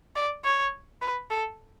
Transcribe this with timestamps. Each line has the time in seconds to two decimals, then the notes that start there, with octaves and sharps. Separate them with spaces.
0.16 D5
0.45 C#5
1.02 B4
1.31 A4